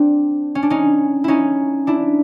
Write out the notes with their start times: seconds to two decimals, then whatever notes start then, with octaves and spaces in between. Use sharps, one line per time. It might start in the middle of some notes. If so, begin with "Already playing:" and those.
Already playing: C4 D4
0.55 C#4
0.63 D4
0.70 C#4 D#4
1.24 C#4 D#4 E4
1.87 D4 E4